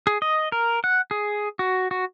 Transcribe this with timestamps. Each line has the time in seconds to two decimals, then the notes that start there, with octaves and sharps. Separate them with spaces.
0.07 G#4
0.22 D#5
0.52 A#4
0.84 F#5
1.11 G#4
1.59 F#4
1.91 F#4